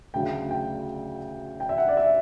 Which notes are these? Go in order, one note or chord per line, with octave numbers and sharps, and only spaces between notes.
D2 C#3 F#3 G5
G5
G5
E5
F#5
D5
E5